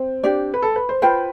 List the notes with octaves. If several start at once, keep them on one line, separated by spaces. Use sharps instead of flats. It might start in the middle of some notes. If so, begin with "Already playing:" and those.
Already playing: C4
D4 G4 D5
B4
A4
B4
C5
F4 B4 C5 G5